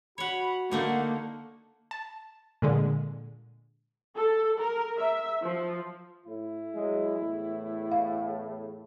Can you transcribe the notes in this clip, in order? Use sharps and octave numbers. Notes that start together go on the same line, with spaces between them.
F#4 C#5 F#5 B5
D3 A3 A#3 D#4 F#5
A5
A#2 D3 G#3
A4
A#4
E5
F3
A2 E4
F#3 G#3
E2 A2
F5